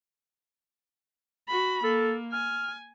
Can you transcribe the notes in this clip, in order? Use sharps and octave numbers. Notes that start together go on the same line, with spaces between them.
F#4 B5
A#3 A4
G#5 F6